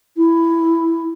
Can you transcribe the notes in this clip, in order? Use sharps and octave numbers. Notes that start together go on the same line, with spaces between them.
E4